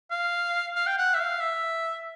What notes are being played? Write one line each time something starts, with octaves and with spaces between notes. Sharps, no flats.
F5
F5
G5
F#5
E5
F5
E5